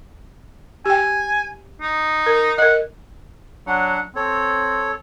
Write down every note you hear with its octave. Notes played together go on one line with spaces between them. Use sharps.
G4 G5 G#5
D#4
A#4
A#4 D#5 F#5
F#3 D4 F#5
C4 A4 C#5